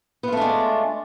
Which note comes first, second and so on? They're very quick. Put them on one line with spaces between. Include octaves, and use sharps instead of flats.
B3 F4 A3 D4 G#3